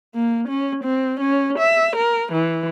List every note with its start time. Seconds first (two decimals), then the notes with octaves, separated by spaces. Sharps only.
0.15 A#3
0.49 C#4
0.84 C4
1.20 C#4
1.59 E5
1.97 A#4
2.33 E3